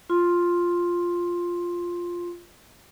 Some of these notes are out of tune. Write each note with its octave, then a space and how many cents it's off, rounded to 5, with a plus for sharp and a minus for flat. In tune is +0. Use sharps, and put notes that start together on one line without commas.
F4 +0 C6 +10